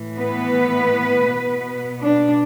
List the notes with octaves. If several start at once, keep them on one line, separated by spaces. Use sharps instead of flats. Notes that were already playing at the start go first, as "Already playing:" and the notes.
Already playing: A2 E3
B3 B4
B2 B3
D4